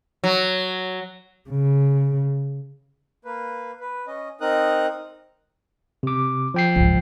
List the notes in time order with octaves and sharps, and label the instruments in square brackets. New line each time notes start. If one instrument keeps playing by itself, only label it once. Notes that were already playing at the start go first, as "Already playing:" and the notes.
[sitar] F#3
[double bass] C#3
[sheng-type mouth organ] A#3 B4
B4
C#4 D#5
C4 D#4 A#4 D#6 F#6
[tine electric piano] C3 D6
F3 G5 C7
[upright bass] C#2 G#2